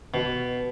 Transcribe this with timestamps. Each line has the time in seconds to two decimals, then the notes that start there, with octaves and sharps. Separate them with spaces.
0.14 B2